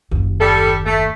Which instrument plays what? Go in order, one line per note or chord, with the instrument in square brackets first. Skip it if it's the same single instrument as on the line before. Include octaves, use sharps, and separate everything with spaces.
[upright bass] F#1 D#2
[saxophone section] G3 A4
A3